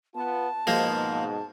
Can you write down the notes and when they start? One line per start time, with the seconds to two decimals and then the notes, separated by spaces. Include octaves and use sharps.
0.15 B3 F4 A5
0.67 G#2 B2 F3 G#3 A#3